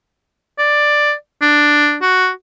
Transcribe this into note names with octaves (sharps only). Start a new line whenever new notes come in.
D5
D4
F#4